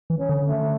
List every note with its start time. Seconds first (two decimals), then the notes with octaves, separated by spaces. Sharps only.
0.10 E3
0.18 C#4
0.29 D3
0.48 A3